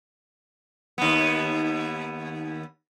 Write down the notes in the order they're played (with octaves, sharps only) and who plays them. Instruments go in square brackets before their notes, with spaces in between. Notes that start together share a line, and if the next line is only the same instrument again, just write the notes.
[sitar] D#2 B3